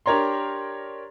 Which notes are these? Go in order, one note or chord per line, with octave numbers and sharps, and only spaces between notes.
D4 G4 A#4 C#5 A#5 C6